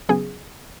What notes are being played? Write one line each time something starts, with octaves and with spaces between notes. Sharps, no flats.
C#3 F#3 B3 G#4